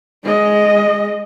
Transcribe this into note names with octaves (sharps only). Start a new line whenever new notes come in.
G#3 D#5